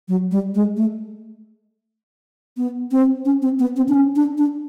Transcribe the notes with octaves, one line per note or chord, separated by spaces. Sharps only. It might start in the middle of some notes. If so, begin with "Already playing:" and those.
F#3
G3
G#3
A3
B3
C4
C#4
C4
B3
C4
D4
C#4
D4
D4